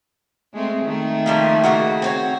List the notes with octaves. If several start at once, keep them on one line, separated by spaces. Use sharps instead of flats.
G#3 A3 C4
D#3 A3
F3 G3 A#3
C#3 A#3 F#4
C4 F#4 C#5